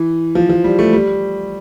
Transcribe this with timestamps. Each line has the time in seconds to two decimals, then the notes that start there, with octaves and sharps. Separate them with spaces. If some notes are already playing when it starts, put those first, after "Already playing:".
Already playing: E3
0.35 F3
0.49 F3
0.64 G3
0.79 A3
0.93 G3